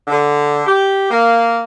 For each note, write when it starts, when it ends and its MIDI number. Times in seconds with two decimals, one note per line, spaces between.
0.08 0.63 50
0.67 1.10 67
1.10 1.62 58